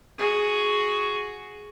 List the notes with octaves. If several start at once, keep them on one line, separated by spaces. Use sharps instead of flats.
F#4 G#4